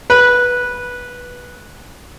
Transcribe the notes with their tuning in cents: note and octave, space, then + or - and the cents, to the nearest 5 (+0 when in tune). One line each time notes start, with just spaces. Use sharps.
B4 -10